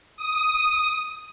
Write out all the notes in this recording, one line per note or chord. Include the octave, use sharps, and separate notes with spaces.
D#6